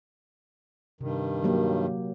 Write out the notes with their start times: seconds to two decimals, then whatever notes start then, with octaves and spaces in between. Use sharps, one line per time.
1.01 G2 C3 D#3
1.44 F#3 A#3 G4